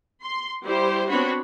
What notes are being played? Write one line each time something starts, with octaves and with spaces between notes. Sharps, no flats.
C6
G3 E4 G4 C5
B3 C4 D4 F#4 C#5 B5